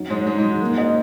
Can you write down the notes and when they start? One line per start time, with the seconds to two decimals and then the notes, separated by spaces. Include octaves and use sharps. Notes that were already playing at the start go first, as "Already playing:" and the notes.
Already playing: F#3 D#4
0.10 G#2 G#3 C#5
0.27 G#2 G#3 G#4
0.38 G#2 G#3
0.44 F#3
0.62 A#3
0.78 D#5